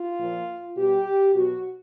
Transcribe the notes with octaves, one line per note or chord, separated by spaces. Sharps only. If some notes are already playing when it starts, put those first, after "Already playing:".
Already playing: F4
A#2 F3
B2 G3 G4
B2 F#3 F#4